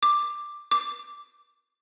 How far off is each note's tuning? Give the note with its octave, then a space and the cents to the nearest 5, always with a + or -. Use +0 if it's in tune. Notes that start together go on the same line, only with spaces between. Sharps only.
D6 +5
D6 -10